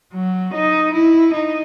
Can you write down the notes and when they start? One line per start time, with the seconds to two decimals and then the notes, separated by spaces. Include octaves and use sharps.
0.13 F#3
0.53 D#4
0.93 E4
1.33 D#4